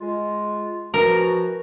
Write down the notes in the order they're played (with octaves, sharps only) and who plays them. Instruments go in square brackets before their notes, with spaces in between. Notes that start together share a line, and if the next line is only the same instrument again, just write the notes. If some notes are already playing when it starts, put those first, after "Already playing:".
[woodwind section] G#3 F4
[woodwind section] E3 F3 F#4 [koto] A#4